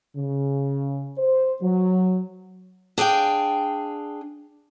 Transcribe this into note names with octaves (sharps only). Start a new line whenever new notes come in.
C#3
C5
F#3
D4 G#4 F5 G5